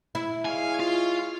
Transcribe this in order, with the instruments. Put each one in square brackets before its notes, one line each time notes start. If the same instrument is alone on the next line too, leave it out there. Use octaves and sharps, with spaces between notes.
[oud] E4
[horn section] G#3 C#5 F5 [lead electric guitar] G#5
[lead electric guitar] F4